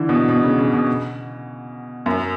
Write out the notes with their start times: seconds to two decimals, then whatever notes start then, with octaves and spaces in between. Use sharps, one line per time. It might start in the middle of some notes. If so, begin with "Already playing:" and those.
Already playing: D3 E3
0.09 B2
0.29 B2
0.43 C#3
0.58 C#3
0.73 B2
2.06 F#2